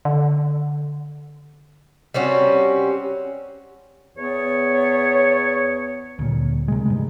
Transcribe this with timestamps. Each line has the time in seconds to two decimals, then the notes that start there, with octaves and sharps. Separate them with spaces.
0.05 D3
2.14 G3 C4 C#4 F#4
4.16 E2 B3 C#5
6.19 D2 A#2
6.68 C3 G#3
6.86 G#2 G3 G#3